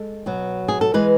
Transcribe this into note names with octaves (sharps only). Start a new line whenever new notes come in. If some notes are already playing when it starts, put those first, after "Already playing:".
Already playing: G#3 A4
B2 F#3
G#4
A4
E3 G#3 B4